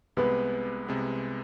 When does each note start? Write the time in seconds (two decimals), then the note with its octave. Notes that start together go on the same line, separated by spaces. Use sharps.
0.17 C2 C3 G#3 B3 B4
0.87 C2 C3 G#3 B3